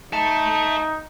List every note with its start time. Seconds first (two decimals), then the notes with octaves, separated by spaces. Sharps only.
0.13 D#4 E5 A5